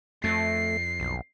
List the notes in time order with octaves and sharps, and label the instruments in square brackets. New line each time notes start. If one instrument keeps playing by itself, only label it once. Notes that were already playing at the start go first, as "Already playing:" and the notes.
[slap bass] F2 [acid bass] A3 [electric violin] C7
[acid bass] B1